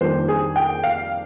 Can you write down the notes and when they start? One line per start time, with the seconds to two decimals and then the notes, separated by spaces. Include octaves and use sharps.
0.01 F2 D#3 G3 A#3 D4 C5
0.28 G#4
0.56 G5
0.84 F5